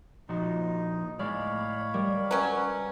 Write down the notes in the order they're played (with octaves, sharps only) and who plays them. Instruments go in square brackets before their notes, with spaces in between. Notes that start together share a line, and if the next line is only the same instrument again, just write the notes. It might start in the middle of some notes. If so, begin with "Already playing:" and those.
[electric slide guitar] A#2 F3 F#4 [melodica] D#4
[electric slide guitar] A2 D5 [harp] G#3 [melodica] C#5 F5 B5
[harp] G3 [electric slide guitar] A#4
[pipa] F#3 C#4 [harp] B4